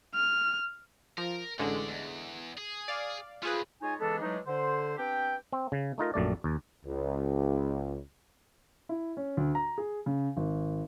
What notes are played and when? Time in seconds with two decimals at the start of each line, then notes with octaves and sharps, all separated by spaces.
0.15 F6
1.18 F3 A#4
1.59 A1 D3 G#3 A3 D5
1.89 E2
2.58 G#4
2.88 D5 F5
3.43 A3 C4 F4 G#4 B4
3.81 G#3 D#4 F4 C#5 D#5 G#5
4.00 C#3 E3 G#3 B3 D4 A4
4.21 E3 F#3 G#3 A3 D4 D#4
4.47 D3 C5
4.97 B3 C4 D4 G4 G5
5.53 C4
5.72 C#3
5.98 A3 D#4 F4 A#4
6.14 A#1 F#2 A3 D5
6.44 D#2
6.86 C#2
8.89 E4
9.17 C#4
9.37 D2
9.55 A#5
9.78 G#4
10.06 C#3
10.37 G#1